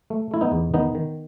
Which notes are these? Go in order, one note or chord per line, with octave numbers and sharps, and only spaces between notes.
A3
A3 E4
B3 D#4
E2
D#3 B3 D#4
D#3